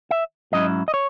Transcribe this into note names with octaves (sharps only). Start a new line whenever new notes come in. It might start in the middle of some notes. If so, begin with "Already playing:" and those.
E5
G#2 F#3 C#4 E4 D#5
D#5
C#5